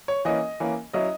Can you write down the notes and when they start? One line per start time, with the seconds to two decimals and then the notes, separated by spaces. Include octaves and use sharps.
0.08 C#5
0.25 E3 A#3 C#4 D#5
0.60 E3 A#3 C#4
0.93 F#3 C#4 E4 D#5